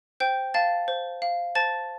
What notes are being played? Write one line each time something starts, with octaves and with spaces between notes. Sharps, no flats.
C5 G5 G6
F5 A5 A6
C5
F5
C5 A5 A6